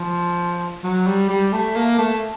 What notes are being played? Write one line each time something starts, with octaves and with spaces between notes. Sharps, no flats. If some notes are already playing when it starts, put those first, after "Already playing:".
Already playing: F3
F#3
G3
G3
A3
A#3
A3